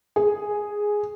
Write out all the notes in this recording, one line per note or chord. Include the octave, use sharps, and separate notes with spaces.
G#4